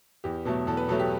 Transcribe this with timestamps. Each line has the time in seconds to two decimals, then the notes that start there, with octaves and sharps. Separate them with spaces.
0.24 E2 G4
0.45 B2 F#3 A3 A4
0.67 E2 A4
0.77 B4
0.89 B2 F#3 A3 A4
0.99 G4